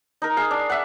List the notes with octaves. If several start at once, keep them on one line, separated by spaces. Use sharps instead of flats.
D#4 A#4
G#4 F5
D4
E5 F#5